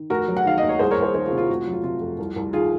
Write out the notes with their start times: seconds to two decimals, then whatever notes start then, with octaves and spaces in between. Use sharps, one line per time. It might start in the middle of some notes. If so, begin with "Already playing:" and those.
Already playing: D#3
0.10 F1 F#4 A#4
0.28 F#3
0.37 F#5
0.45 D#3 F5
0.58 D#2 D#5
0.69 C#5
0.79 C2 G#4 C5
0.91 A#4 C#5
0.97 C2
1.03 G#4 C5
1.14 D#3 G#4 C5
1.26 F4 G#4
1.32 C3
1.38 F4
1.49 F1 F#4
1.61 F4
1.67 F#3
1.73 F4
1.84 C3 F4
2.01 F2
2.19 C2
2.36 C2
2.53 D#3 F4 G#4